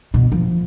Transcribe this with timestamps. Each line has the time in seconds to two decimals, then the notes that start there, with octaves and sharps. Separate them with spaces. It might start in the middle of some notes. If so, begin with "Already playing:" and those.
0.14 B2
0.32 F3